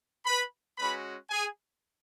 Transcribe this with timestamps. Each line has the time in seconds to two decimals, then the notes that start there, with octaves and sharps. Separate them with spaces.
0.25 B4 B5
0.78 G#3 C#4 F#4 B4 B5
1.30 G#4 G#5